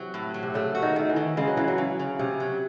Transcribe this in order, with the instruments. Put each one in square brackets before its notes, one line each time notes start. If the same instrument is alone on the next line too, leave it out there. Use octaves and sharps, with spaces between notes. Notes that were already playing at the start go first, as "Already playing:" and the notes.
Already playing: [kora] C3 E3 [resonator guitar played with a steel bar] F#3
[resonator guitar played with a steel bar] A2
F#3
[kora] C3
[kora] C#3 [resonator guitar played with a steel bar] A3
[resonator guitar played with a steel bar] F#4
[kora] D#3
[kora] D#3 [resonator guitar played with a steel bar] A3
[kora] E3
[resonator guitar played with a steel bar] D#3
[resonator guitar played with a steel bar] C#3 [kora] G#3
[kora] F#3
[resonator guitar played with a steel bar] C#3 [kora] E3
[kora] F#3
[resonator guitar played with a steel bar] C#3
C#3
[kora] C3 [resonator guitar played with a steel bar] C#4
[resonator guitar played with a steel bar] F#3